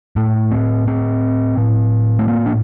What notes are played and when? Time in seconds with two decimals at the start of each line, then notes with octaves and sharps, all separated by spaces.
0.16 A2 A3
0.51 C4
0.87 C4
1.57 A2
2.19 A3
2.28 A#3
2.46 D4